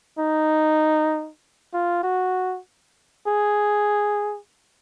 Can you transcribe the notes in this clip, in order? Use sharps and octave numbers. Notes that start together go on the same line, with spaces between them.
D#4
F4
F#4
G#4